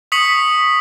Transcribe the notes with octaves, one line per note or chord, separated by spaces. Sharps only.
C#6 D#6 B6 C#7 F#7